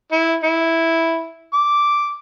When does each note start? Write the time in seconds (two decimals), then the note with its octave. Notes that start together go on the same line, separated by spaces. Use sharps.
0.12 E4
0.43 E4
1.54 D6